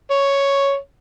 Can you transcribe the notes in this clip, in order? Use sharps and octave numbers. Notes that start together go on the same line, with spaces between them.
C#5